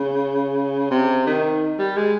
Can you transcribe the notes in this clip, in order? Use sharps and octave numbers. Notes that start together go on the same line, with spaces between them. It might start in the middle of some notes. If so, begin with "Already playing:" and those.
Already playing: C#3
C3
D#3
G3
G#3